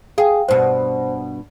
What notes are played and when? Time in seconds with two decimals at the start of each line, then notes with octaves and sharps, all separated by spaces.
0.18 G#4 F5 G5
0.48 G2 B2 C5